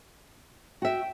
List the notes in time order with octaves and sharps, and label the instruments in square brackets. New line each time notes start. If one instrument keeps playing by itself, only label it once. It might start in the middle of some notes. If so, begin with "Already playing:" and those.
[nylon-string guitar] F#4 E5 [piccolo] G5